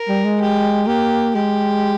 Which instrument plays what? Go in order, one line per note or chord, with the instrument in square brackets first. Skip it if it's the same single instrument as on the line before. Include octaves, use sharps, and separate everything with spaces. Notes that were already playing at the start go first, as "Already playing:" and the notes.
Already playing: [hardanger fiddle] A#4
[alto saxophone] G3
G#3
[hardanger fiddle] G4
[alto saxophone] A#3 [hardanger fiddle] G4
[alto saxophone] G#3 [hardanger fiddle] G4